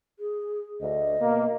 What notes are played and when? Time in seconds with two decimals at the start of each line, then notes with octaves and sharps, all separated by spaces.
0.19 G#4
0.81 D2 D#5
1.21 B2 A#3